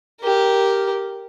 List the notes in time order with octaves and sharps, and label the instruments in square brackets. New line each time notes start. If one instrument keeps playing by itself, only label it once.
[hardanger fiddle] G4 A#4